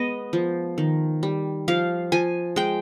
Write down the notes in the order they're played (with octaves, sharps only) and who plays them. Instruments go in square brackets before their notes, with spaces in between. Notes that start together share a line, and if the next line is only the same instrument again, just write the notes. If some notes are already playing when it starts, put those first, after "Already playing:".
Already playing: [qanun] G#3 B3 D#5
F3
D#3
G3
F3 F5
F3 G#5
G#3 G5